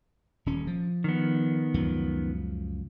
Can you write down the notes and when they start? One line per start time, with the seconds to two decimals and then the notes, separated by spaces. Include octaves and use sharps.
0.46 D#1 C#4
0.67 F3
1.04 D#3 B3
1.74 C#2 F#2 F3